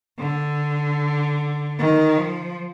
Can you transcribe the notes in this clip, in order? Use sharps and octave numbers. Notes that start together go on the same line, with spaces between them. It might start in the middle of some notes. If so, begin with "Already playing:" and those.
D3
D#3
F3